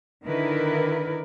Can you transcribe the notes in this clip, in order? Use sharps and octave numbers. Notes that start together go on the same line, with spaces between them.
D3 D#3 E4 A#4 B4